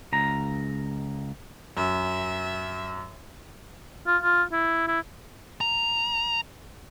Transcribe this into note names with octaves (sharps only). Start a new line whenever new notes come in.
C#2 A#5
F#2 E5
F4
F4
E4
E4
A#5